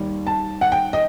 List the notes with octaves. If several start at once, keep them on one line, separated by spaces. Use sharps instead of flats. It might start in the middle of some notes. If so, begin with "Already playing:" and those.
Already playing: D#2 D#3 G3
A5
F#5
G5
D#5